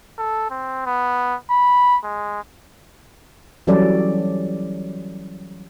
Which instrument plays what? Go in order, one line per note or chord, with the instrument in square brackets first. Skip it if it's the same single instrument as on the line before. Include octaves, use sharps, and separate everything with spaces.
[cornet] A4
C4
B3
B5
G#3
[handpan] E3 F#3 G3 C#4 A4 D5